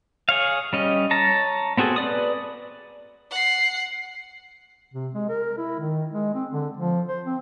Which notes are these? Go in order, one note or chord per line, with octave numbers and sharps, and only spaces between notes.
G#4 C#5 F5
G3 C#4 D#5
C#5 A5 A#5
B3 C4 F#4 G#4 A4
B4 D5 D#6
F#5 C7
C3
G#3
A#4
E4
D#3
G#3
C4
D3
F3
C5
C4